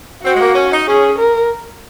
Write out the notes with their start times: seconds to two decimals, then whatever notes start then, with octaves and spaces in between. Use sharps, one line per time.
0.24 C4 F#4
0.34 G#3
0.40 A#3
0.55 C#4
0.72 D#4
0.87 C#4 G#4
1.19 A#4